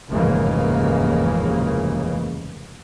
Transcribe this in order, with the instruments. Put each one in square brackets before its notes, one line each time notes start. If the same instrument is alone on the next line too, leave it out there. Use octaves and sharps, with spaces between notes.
[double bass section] F1 D#2 G#2 C#3 E3 A#3